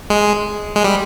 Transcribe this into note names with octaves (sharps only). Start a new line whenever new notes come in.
G#3
G#3
G3